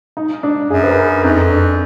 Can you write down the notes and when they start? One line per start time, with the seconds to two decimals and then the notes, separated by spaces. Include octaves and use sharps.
0.17 D#4
0.43 D4
0.70 F#2 G#4
0.84 B4
0.88 A#4
1.23 F2 D#4
1.50 D4